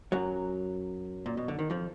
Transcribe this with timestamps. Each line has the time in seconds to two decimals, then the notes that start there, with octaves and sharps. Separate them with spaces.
0.12 F#2 F#3
1.26 A#2
1.37 B2
1.48 D3
1.59 D#3
1.70 F2 F3